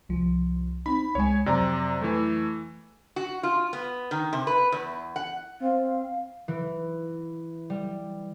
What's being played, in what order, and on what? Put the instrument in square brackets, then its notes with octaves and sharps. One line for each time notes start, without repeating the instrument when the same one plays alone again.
[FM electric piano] C2 F3
[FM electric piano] C4 D#4 [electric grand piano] B5
[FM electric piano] C#2 G#3 [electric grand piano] C#5 G#5
[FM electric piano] F2 F#3 [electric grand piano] C3 D5 A#5
[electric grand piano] E3 A3
[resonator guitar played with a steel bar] F#4
F4
B3
D#3
C3
B4
E2
F#5
[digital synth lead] C4 [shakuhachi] F5
[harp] E3
G3